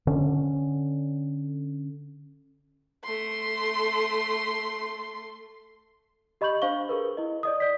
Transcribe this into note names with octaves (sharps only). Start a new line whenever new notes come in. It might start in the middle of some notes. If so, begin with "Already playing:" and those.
D3 C#4
A3 C6
G4 D#5 B5 C#6 G6 F#7
D4 C5 F5 C#6 G7
G#4 A#4 B4
E4 D#5
D5 D#5 D#6
D5 B6